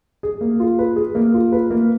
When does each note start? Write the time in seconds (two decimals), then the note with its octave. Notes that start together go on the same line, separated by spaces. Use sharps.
0.23 G#4
0.41 A#3
0.60 F4
0.79 B4
0.96 G#4
1.15 A#3
1.34 F4
1.52 B4
1.71 A#3